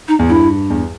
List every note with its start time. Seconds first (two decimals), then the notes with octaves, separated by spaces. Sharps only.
0.08 D#4
0.19 E2
0.29 G2 E4
0.70 E2